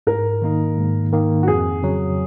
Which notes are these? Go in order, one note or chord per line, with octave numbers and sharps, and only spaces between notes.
G#2 A#4
D#3 A#3 D#4
G#2
D#3 A#3 D#4
F#4
F2 G#4
C#3 F#3